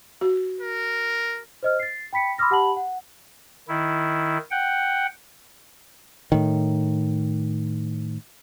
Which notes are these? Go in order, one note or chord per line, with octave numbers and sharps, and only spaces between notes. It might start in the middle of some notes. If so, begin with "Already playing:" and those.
F#4
A#4
C5 D#5 F6
A6 C7
G5 B5 B6 C#7
B5 C6 D6 E6 F6 A#6
G4 F#5 A5 B5 F#7
F#5
D#3 E4
F#5 G5
A2 D#3